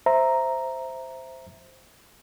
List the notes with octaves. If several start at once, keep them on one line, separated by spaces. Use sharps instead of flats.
C5 E5 A#5